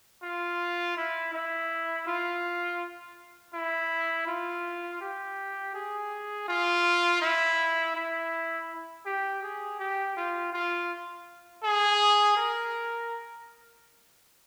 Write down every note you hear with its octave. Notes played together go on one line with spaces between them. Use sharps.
F4
E4
E4
F4
E4
F4
G4
G#4
F4
E4
E4
G4
G#4
G4
F4
F4
G#4
A#4